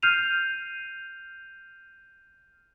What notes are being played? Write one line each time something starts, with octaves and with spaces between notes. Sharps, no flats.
F6 G6 C7 D#7 F7